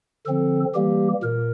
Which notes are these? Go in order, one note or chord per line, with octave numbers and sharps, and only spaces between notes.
D3 F3 C4 A4
E3 G3 A#3 G4
A#2 A#4